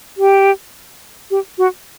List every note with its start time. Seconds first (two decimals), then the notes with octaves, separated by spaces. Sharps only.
0.17 G4
1.31 G4
1.58 F#4